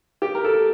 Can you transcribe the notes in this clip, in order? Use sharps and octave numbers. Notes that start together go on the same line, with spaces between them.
G4
A#4
A4